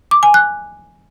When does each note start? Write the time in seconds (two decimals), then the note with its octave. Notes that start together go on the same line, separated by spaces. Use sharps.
0.11 D6
0.23 G#5
0.34 F#6